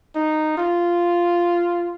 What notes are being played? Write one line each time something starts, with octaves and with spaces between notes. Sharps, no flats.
D#4
F4